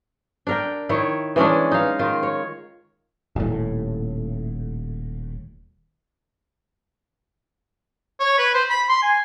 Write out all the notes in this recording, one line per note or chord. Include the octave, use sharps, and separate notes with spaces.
D4 A#4 G5
D#3 E4 C#5
E3 G#3 C#4 D4
D#4 F5
D#3 F4
C#5
D#1 A2
C#5
B4
C5
B5
C6
G#5